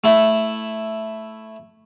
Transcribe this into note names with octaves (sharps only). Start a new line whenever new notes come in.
A3 E4